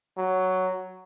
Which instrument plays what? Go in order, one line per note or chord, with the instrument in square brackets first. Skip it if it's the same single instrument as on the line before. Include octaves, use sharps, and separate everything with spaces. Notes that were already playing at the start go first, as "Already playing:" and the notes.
[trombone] F#3